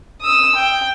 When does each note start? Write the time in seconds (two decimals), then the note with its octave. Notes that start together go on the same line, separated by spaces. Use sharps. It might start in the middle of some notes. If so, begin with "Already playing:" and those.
0.21 D#6 E6
0.55 G5